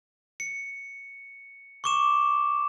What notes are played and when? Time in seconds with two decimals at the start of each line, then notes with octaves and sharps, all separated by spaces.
0.40 C#7
1.84 C#6 D6 E7